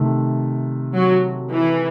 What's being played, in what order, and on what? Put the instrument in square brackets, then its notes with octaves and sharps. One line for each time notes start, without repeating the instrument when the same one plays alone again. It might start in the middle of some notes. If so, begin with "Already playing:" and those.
Already playing: [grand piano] C3 D#3 A3
[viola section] F#3
E3